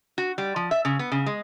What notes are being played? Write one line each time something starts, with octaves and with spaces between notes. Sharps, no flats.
F#4
G3
F3
E5
C#3
B3
C#3
G#3